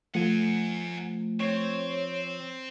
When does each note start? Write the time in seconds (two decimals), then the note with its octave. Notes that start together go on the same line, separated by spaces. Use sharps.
0.15 F3 A3 F#5 G#5
1.40 C4 C#5